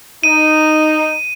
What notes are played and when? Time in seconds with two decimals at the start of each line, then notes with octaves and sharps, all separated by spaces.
0.23 D#4 D#7